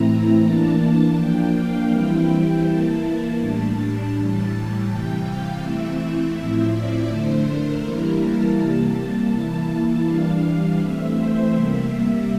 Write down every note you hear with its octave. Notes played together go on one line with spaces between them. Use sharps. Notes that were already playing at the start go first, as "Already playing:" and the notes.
Already playing: A2 E3 A3 C4 E4 A#5
E3 A#3 D4 A5
F3 A#3 D4 G5
F5
E3 G3 C4 E4 G5
E3 A#3 E4 A5
A2 G3 D4 A5
A2 E3 G3
C3 E3 G3 G5
F5
E3 A3 C4 E4 E5
A2 F3 C4 E4 E5
D5
D3 A3 D4 C5
A#4
E3 G3 A#3 E4 A#4
A5
C3 G3 A#3
E3 A#3 E4
E3 G3 D4 F5
E3 A3 C4 E5
C5
C3 G3 A#3 E5